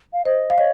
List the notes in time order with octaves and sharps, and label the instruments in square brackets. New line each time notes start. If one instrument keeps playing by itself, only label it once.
[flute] F5
[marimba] C5 [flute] D#5
[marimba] F5
[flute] C#5 [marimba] D#5